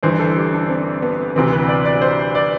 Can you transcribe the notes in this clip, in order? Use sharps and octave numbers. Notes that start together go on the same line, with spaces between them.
G1 G2 E3 C5
A4
G4
D4
C4
B3
D2 C3 E3 C4
B4
D5
D5
C5
D5